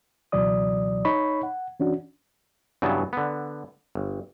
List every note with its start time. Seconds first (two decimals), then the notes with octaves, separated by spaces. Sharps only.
0.32 C#2 B2 E3 F#3 D5 D#6
1.05 D#4 C#5 B5 C#6
1.43 F#5
1.79 E3 C#4 D4 F#4
2.82 G2 C#3 E3 F#3 B3 A5
3.13 D3 B3
3.95 G1